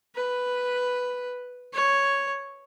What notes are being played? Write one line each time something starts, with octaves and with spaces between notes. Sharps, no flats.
B4
C#5